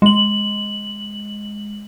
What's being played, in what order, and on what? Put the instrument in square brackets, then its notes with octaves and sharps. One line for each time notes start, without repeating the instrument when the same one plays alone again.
[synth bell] G#3 F#7